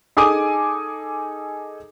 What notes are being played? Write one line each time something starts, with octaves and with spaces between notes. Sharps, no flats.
D#4 G#4 A4 G#5 D6 D#6